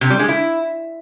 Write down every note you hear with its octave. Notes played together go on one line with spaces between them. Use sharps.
C3
G3
G#3
E4